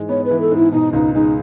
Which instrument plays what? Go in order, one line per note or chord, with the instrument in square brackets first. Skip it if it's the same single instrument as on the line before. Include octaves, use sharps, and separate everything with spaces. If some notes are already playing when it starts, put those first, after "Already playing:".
Already playing: [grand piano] G#2 E3 G#3
[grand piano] B3 [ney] C#5
[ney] B4
[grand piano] E3
[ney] A4
[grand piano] G#2
[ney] E4
[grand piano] B2 [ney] D#4
[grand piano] C#2 [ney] D#4
[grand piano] G#3 [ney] D#4